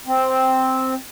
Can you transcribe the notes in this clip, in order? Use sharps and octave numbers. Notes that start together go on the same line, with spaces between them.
C4